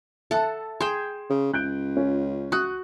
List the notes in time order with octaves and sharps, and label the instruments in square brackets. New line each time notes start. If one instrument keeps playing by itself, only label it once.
[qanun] A4 F#5 [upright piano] E5 A5
[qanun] G#4 G5 [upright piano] C6 E7
[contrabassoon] C#3
[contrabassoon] C#2 [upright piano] F#6 G6 D7
[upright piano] C#4 F4
[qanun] F#4 [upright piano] D#6 F#6